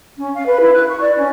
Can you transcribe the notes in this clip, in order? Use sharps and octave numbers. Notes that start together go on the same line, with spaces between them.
C#4
F5
B4
E4
F#6
C#6
D5
C#4